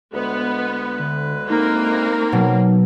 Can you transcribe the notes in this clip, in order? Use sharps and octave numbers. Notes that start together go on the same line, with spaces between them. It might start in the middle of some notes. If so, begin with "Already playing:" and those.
D2 G#3 B3 B4
D3
A#3 C4 D#4 A#4
B2 F#3